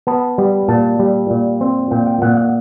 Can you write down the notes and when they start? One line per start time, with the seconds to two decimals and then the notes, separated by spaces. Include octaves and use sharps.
0.07 B3 A5
0.38 G3
0.68 A#2 A5
0.99 G3
1.30 A#2
1.61 C4
1.91 A#2 G5
2.07 G5
2.22 A#2 F#5
2.37 F#5